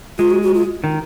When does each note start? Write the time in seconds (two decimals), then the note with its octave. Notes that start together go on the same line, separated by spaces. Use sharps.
0.18 G#3 F4
0.30 F#4
0.42 F#4
0.55 F4
0.84 D#3